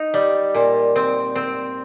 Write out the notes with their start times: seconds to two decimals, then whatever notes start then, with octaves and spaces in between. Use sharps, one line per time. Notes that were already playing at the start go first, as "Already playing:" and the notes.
Already playing: D#4
0.14 G3
0.55 A#2
0.96 C4
1.36 C4